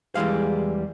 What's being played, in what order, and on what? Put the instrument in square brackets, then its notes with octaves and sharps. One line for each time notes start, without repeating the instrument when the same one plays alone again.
[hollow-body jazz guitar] E2 E3 G3 G#3 F5